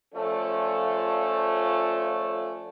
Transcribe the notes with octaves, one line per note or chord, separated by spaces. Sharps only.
F3 A3 C#4 F4 A4 D5